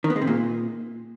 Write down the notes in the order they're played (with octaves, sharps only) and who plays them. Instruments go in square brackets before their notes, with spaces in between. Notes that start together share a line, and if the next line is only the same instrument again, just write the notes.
[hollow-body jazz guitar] D#3
B3
G#3
C3
A#2